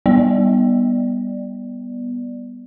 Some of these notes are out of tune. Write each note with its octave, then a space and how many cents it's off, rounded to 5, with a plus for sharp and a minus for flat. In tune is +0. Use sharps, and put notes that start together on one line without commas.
G3 +0 B3 -15 D5 +5